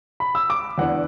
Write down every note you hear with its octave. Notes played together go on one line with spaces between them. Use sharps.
B5
E6
D6
E2 E3 D4 F#5